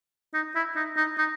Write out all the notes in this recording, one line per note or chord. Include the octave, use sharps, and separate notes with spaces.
D#4
E4
D#4
D#4
D#4